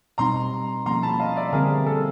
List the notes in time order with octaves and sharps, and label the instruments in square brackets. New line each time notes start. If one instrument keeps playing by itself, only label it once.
[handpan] B2 G3 C4 D#4 [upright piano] A#5 C6
[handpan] F3 A#3 C#4 [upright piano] A#5 C6
[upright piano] A5 B5
D#5 F5
D5 E5
[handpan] D3 G3 C4 [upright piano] G#4 A#4
[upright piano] A4